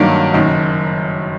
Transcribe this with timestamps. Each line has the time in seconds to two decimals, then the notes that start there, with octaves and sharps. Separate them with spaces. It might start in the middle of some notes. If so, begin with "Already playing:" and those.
Already playing: G2 D#3 F#3 A#3 D4
0.34 F#1 F#2 D#3